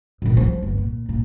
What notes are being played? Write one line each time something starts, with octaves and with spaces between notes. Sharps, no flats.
A#2 D#3
F3 F#3
G1
A#2
A#2